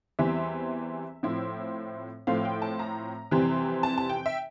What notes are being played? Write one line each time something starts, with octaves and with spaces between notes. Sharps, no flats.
E2 E3 G3 C4 E5
A2 F3 C4 E4
A2 F3 A3 C4 F5
G5
A5
A#5
F2 C3 E3 G3 C4
A5
A5
G5
E5